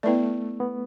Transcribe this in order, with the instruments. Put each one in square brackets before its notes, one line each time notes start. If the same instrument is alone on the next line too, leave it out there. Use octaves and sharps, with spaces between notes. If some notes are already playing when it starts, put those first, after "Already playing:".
[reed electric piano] A3 [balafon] B3 E4 B4 D5
[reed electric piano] B3